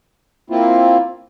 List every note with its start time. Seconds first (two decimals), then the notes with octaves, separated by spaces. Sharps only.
0.50 A#3 C4 E4 F4